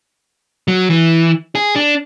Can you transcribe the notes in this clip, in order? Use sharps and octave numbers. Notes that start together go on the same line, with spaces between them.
F#3
E3
G#4
D4